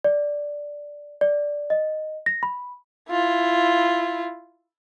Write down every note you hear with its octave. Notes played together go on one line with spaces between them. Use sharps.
D5
D5
D#5
A#6
B5
E4 F4